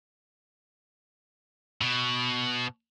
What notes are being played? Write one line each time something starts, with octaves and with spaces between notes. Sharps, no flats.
B2